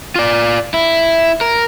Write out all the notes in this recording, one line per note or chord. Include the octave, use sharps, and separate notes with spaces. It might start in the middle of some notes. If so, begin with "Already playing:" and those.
F4 D5
E4
A#4